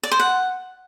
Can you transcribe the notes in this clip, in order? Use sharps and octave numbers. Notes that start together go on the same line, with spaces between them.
D5
C5
F#5